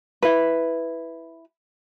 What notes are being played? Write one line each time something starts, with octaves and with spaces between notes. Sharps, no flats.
E4 B4